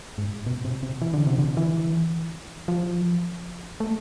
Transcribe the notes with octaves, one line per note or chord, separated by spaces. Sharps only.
G#2
B2
C3
C3
E3
D3
C3
D3
E3
F3
A3